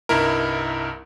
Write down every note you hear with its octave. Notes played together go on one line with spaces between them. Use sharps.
C2 G2 D#4 E4 A#4